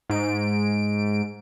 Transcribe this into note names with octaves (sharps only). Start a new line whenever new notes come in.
G#2 D7